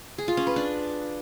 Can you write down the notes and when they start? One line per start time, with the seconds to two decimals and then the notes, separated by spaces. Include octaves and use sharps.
0.18 G#4
0.28 F4
0.37 C#4
0.47 B4
0.56 D4